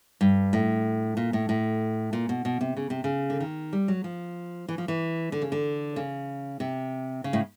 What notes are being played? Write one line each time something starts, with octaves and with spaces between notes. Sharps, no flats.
G2
A2
A#2
A2
A2
A#2
B2
B2
C3
C#3
C3
C#3
D3
D#3
G3
F#3
F3
E3
F3
E3
D3
C#3
D3
C#3
C3
C#3
A2